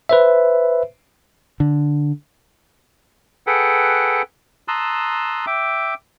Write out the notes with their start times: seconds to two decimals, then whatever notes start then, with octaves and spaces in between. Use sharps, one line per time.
0.09 B4 C5 E5
1.60 D3
3.47 G#4 A4 B4 F#5 G5
4.68 A5 A#5 C6 D#6 E6 F#6
5.47 E5 G5 D6